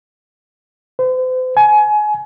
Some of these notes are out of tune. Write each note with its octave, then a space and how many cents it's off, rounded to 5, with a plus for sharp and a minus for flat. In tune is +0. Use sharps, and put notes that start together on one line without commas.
C5 -40
G#5 +25